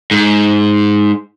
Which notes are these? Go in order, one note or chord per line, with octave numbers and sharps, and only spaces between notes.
G#2